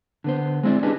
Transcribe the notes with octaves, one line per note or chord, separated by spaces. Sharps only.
D3 B3 C5
G#3 C4 E4 D5
C#4 D4 G4 G#4 B4 D#5